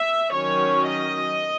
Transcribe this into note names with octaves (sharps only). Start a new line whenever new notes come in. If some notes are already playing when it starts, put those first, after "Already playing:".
Already playing: E5
D#3 F#3 C#4 C#5
D#5